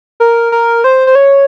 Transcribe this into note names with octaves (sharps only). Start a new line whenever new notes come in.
A#4
A#4
C5
C5
C#5